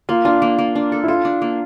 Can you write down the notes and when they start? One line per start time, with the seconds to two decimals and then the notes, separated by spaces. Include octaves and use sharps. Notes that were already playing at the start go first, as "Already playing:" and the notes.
0.09 A#3 F4
0.25 D4 F4
0.42 A#3
0.58 A#3
0.75 D4
0.92 A4
1.04 E4
1.08 F4 A4
1.25 D4
1.42 A#3